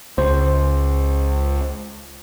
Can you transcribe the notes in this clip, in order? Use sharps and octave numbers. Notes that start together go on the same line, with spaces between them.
C#2 C5